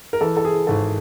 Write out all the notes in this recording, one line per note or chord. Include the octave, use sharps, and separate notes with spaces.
A#4
E3 A4
A4
G#4
G#1 A4